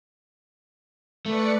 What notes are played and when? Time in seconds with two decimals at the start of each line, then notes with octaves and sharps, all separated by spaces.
1.26 A3 B4 D5 C#7